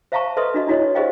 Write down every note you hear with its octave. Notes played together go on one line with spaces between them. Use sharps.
C5 E5 F5 A5 A#5 C#6
A4 B4 D#5 E5 C6 D#6
D4 F#4 D#5
D4 E4 F#4 C#5 D#5
G4 G#4 C5 D#5 F5 G5